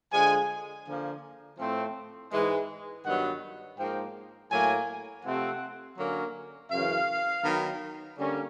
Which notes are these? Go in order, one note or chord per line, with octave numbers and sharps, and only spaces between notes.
D3 F3 G#3 G#5
D3 F3 A#3
A2 F3 A3 C4
G#2 E3 G#3
G2 D#3 F#3 B3 F#5
G#2 F3 A#3 G5
A2 F#3 A#3 G#5
C3 F3 A3 C4 F#5
D3 F#3 A#3 C#4
F#2 C#3 E3 F5
D#3 F#3 B3
D3 G3 A#3 C#4